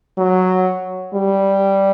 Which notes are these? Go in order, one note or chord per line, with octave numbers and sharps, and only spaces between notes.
F#3
G3